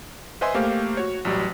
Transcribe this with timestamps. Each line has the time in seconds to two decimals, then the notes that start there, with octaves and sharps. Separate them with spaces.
0.41 B4 C5 D#5 E5 G#5 C6
0.54 A3 A#3 G4 C5 F5
0.97 F#4 C#5
1.25 A1 F#3 G3